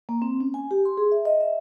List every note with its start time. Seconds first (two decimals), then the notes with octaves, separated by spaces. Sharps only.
0.09 A#3
0.22 C4
0.40 C#4
0.54 G#5
0.71 G4
0.85 C6
0.97 G#4
1.12 E5
1.25 D#5
1.40 E5